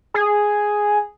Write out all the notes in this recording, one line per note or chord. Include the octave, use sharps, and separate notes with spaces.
G#4